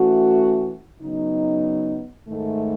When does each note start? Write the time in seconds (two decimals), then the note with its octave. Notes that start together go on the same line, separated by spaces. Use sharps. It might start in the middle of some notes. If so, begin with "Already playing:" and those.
Already playing: E3 A3 C#4 F#4
1.01 C#3 F#3 B3 D#4
2.29 G#2 D#3 A3